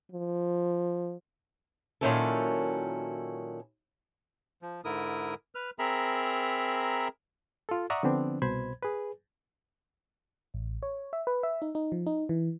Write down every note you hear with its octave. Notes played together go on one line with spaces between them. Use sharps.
F3
A#2 D#3 F#3 C#4 E4 A4
F3
G#2 D3 E4 A#4 D#6
B4 F6
C4 G#4 A#4 E5 A#5 B5
F4 A4
D5 E5 F#5 A#5 C#6 D#6
D3 F3 B3 C4 D4
C2 B2 C5 B5 G#6
G#4 B4
A1
C#5
E5
B4
E5
D#4
D#4
F3
D#4
E3